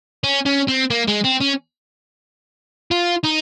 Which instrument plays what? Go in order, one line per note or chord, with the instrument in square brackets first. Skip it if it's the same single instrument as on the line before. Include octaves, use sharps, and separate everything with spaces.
[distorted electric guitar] C#4
C#4
C4
A#3
G#3
C4
C#4
F4
D#4